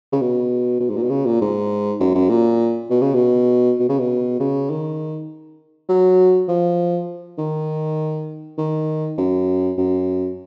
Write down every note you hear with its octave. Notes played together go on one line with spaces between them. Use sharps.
C#3
B2
B2
G#2
A#2
B2
C#3
A#2
G#2
F#2
F#2
A#2
B2
C#3
B2
B2
C#3
B2
C#3
D#3
F#3
F3
D#3
D#3
F#2
F#2